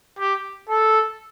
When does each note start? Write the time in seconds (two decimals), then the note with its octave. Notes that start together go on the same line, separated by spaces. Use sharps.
0.19 G4
0.69 A4